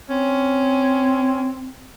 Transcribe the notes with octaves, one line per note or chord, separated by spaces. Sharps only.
C4 C#4